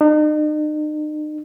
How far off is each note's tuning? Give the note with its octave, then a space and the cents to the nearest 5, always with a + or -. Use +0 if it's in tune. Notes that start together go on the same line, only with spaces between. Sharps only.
D#4 -40